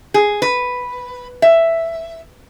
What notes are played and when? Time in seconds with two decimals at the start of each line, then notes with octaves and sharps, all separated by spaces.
0.14 G#4
0.42 B4
1.42 E5